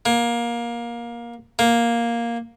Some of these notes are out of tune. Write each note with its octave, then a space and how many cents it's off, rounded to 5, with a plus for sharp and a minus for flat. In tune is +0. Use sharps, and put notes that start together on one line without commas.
A#3 +20
A#3 +5